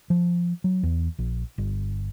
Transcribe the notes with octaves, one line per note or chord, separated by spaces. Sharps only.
F3
F#3
E2
A#1
G1